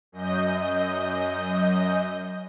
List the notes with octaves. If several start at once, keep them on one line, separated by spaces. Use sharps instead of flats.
F#2 D#5 G6